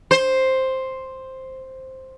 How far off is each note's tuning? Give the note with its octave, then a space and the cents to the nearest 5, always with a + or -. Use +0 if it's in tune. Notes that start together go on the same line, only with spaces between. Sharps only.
C5 +5